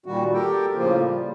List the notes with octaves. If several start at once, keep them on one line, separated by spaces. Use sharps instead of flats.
A#2 D#3 G3 F#4
G4 A4 A#4 G5
A2 C#3 F3 A#3 F4
G3